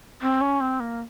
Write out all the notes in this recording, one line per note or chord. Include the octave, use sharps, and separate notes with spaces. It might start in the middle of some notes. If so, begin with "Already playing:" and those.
C4
C#4
C4
A#3